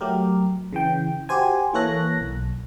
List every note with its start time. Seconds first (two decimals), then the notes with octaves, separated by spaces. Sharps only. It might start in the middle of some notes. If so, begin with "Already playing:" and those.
0.01 F#3 A3 G4 A#4
0.73 C#3 E3 G5
1.29 F#4 G4 C5 G#5
1.74 E3 A#3 A4 C#5 F#6 A#6
2.21 B1